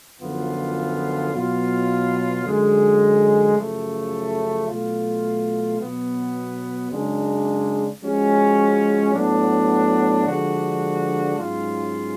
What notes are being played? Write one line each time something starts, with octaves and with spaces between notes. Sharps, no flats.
F#2 D3 F3 B3 F4
B2 F#3 B3 F4
F#2 D3 G#3
F#2 C#3 F3 A3
B2 F#3 A3 F4
B2 F#3 B3
F#2 C#3 G#3 D4
F3 G#3 C#4 F#4
A2 F#3 B3 D4
D3 F3 G#3 D4 F#4
G#2 F#3 C#4 F4